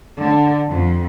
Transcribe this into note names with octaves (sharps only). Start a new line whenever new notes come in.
D3
F2